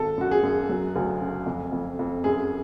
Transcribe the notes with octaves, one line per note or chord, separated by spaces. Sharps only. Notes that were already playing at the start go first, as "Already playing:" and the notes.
Already playing: G#1 A4
F#2 F#4
G#4
F#2
F#3
D2
C#3
F2
F2
F2
F#2 G#4